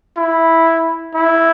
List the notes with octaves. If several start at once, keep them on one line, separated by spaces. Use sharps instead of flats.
E4
E4